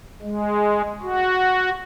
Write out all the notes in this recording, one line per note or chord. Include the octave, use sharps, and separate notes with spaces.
G#3
F#4